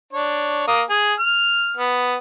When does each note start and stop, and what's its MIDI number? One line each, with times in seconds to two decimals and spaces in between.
0.13 0.65 62
0.13 0.65 73
0.68 0.82 58
0.68 0.82 87
0.90 1.14 68
1.20 1.75 89
1.77 2.16 59